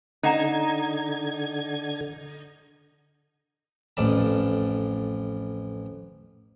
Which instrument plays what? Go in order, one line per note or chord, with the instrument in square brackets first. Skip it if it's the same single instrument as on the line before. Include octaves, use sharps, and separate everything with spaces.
[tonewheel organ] D3 G#6 [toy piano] C#4 F#5 A#5 [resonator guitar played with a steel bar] D#4
[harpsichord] A1 F2 D5 A5